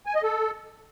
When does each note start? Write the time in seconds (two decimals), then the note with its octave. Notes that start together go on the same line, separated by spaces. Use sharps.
0.06 G#5
0.15 D#5
0.23 A4